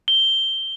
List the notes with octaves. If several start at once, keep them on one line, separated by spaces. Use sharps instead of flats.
G7